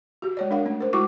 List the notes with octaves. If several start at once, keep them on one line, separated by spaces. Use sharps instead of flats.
F#4 G4
G#3 C#5 D5
D4 A#4 F5 F#5
A3 C#4
A#4 C5
G#3 E4 F#4 C#6 D6